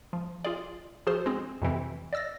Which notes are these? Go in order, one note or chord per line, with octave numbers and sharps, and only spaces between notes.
F3
F4 G#4 D5
F3 F#4 G#4 A4 C5
G#3 C4
F2 C3 E3 C4
D5 D#5 E6 A6 A#6